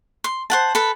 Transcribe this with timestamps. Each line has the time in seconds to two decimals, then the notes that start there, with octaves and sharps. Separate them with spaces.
0.24 C6
0.50 C5 F#5 A5
0.75 A4 B4 B5